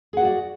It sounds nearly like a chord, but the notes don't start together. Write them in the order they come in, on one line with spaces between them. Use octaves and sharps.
G#4 F#5 F#4 D5